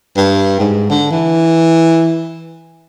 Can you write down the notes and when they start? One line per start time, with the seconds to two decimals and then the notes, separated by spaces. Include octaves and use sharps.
0.17 G2
0.60 G#2
0.90 D3
1.11 E3